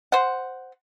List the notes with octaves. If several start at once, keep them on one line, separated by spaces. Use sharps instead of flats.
C5 F#5